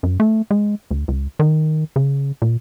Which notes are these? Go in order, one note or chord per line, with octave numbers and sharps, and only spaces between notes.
F#2
A3
G#3
D2
C#2
D#3
C#3
A#2